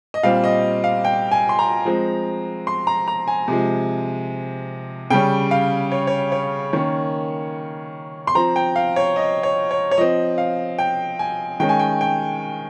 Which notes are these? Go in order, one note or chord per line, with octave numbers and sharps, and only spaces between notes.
D#5
A#2 G3 C4 F5
D#5
F5
G5
G#5
C6
A#5
F3 G#3 C4
C6
A#5
A#5
G#5
C3 F3 G#3
C#3 G3 C#4 G5
F5
C#5
C#5
C#5
D#3 A#3 C#4 C#5
C6
F3 C4 A#5
G5
F5
C#5
D#5
C#5
C#5
C#5
F3 C4 D#5
F5
G5
G#5
D#3 G#3 C#4 G5
G#5
G5
G5